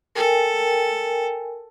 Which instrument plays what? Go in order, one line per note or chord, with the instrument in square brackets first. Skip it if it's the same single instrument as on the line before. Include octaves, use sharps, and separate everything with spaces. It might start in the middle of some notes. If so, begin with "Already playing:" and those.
[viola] A4 [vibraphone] A#4 G5 G#5